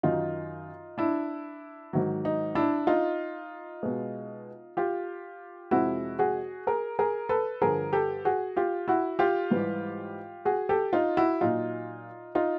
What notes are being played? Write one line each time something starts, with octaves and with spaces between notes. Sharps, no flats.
F#2 D#3 F#3 D#4 F4
D4 E4
G#2 D#3 F#3
D#4
D4 E4
D#4 F4
B2 G#3
F4 G4
F2 C3 F3 G#3 E4 F#4
F#4 G#4
G#4 A#4
G#4 A#4
A4 B4
G2 D3 F3 G#4 A#4
G4 A4
F#4 G#4
F4 G4
E4 F#4
F4 G4
G#2 E3 G3
F#4 G#4
G4 A4
D#4 F4
E4 F#4
A#2 F#3 D#4 F4
D#4 F4